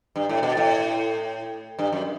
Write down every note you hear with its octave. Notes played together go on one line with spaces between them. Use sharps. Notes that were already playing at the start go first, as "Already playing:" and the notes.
G2
A2
B2
A2
G2
F#2